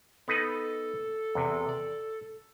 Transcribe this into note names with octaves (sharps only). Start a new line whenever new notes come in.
B3 D#4 A4 B4
E2 C3
D5